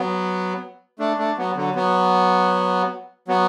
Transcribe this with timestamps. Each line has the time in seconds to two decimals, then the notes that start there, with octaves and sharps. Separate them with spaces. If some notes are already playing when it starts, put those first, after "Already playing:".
Already playing: F#3 B3
0.99 A3 D4
1.18 A3 D4
1.38 F#3 B3
1.56 D3 F#3
1.75 F#3 B3
3.28 F#3 B3